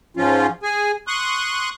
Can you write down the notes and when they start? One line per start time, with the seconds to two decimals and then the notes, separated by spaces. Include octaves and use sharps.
0.17 G#2 F3 C#4 F4
0.63 G#4 G#5
1.07 C6 C#6 D#6 F#6